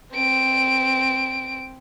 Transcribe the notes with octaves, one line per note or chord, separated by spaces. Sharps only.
C4 D7